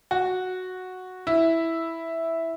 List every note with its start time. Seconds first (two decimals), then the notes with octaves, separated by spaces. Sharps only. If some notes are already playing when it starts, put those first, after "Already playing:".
0.11 F#4
1.27 E4